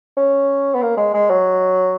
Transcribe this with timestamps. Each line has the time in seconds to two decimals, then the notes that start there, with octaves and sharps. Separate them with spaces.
0.17 C#4
0.75 B3
0.82 A#3
0.98 G#3
1.14 G#3
1.30 F#3